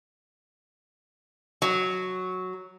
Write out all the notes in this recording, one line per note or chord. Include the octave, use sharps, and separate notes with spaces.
F#3